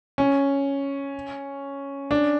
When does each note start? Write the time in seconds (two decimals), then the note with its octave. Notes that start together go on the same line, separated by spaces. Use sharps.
0.18 C#4
2.11 D4